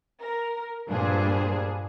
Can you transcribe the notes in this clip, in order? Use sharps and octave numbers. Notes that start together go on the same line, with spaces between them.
A#4
G2 A#2 G3 D4 G#4 C5